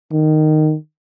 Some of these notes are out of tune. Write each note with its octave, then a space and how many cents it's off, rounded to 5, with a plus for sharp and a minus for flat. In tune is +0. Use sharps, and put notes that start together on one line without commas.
D#3 -10